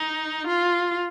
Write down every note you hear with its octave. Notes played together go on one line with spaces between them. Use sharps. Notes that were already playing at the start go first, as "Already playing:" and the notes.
Already playing: D#4
F4